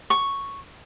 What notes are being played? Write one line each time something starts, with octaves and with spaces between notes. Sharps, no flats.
C#6